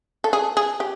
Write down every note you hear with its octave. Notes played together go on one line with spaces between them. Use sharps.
A4
G#4
G#4
G4